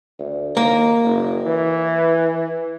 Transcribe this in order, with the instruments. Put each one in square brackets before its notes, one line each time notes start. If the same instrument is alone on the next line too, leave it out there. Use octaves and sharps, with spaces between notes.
[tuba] D2
[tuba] D#2 [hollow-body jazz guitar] A#3
[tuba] F#1
E3